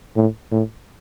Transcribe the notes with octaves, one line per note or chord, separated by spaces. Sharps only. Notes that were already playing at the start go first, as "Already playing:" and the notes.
A2
A2